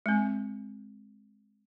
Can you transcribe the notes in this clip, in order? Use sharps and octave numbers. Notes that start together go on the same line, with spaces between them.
G#3 C4